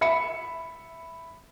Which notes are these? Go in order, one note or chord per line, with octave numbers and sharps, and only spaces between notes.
E5 B5 C#7